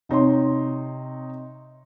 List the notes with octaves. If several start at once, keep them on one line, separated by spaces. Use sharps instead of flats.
C3 D#4 C#5 C6